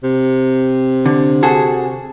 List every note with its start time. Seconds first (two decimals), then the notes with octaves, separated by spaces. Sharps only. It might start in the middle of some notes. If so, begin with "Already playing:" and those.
0.04 C3
1.06 D3
1.43 F#4 G#4 A4